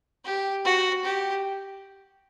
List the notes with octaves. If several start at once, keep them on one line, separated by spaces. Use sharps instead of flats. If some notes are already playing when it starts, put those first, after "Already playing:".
G4
F#4
G4